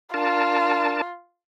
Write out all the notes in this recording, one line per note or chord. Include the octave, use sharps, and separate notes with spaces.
D4 F4 A#4 A5